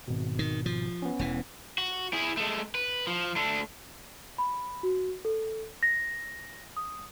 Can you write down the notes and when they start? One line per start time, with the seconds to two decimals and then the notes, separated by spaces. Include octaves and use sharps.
0.08 G#1 B2
0.39 D#3
0.66 F3
1.02 B3 C#4
1.19 E1 E3
1.78 F#4
2.13 E4 G#4
2.37 G#3 A3
2.75 B4
3.07 F3
3.36 A3 D4
4.38 B5
4.83 F#4
5.25 A4
5.83 A#6
6.77 D#6